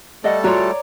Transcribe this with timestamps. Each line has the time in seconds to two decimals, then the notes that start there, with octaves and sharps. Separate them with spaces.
0.24 G3 A3 A4 D5 D#5 F#5
0.44 F4 F#4 C#5 D5 A#5